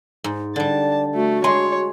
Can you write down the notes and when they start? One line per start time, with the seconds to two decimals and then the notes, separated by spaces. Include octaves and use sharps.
0.24 G#2
0.56 D3 G3 D5 A5
1.15 A3 F#4
1.44 G#3 C#5 C6